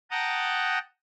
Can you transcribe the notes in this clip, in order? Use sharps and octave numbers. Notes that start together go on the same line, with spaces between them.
F#5 G5 A5 A#5 D#6